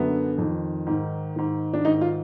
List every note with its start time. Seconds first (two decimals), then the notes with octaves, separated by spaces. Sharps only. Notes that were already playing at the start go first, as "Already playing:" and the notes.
Already playing: F#2 D3 B3
0.38 F2 D#3
0.87 G#2 D#3
1.36 G#2 D#3
1.73 D4
1.85 G#2 D#3 D#4
2.01 F4